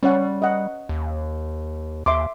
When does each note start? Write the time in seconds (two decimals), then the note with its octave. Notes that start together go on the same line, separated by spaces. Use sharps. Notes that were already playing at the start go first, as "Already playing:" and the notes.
0.03 G3 C#4 C#5 F#5
0.42 D#5 F#5
0.89 D#2
2.06 D#2 E5 C6 D6